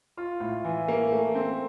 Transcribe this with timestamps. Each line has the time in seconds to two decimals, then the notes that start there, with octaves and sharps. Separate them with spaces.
0.17 F4
0.40 A2
0.64 E3
0.88 A#3
1.12 A3
1.35 C4